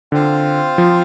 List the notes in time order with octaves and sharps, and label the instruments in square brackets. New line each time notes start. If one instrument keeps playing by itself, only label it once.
[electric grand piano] D3 [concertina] C4 F4 C5 F5
[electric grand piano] F3